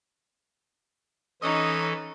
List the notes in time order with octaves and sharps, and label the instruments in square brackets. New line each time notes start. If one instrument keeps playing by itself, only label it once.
[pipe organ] E3 A4 [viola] C#4 D#4 [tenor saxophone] D#5